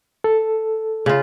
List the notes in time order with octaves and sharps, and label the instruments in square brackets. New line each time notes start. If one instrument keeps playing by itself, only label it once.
[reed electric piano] A4
[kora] C#3 F4